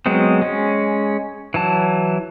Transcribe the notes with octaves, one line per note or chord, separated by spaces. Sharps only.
F#3 G#3 B3 C4
G#3 C#4
E3 F#3 A5